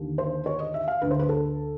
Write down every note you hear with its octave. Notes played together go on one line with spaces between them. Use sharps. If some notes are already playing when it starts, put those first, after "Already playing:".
Already playing: D#2 D3
C5
C#5
D#5
E5
F5
D2 D3 B4
C5
B4
A4